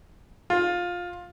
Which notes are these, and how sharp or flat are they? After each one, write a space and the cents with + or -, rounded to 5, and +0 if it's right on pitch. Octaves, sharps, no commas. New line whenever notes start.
F4 +15